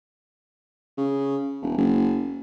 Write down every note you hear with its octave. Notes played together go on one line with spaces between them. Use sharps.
C#3
E1
F#1